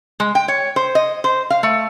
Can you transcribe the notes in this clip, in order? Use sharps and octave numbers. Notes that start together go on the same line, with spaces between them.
G#3
G5
C#5
C5
D#5
C5
F5
A3